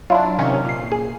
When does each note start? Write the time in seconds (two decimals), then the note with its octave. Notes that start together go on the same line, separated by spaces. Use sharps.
0.10 F#3 D4 E4 F4
0.39 C3 D#3 C#4
0.65 A#2 C7
0.92 G#4